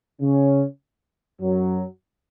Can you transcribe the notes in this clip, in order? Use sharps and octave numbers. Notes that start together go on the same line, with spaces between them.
C#3 C#4
F#2 F#3